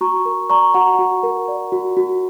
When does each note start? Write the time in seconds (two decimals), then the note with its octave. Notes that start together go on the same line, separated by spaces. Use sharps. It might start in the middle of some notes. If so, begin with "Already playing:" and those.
0.01 F#4 A#5 C#6
0.25 A#4
0.49 D5 A#5 C#6
0.74 F#4 F#5 A#5
0.99 F#4
1.23 A#4
1.48 D5
1.72 F#4
1.97 F#4